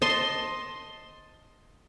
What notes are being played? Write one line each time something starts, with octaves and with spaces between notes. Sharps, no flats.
D#5 A5 C6